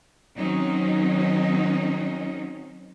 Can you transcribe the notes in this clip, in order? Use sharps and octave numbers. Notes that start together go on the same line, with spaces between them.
D#3 F#3 C4 C#4 D#4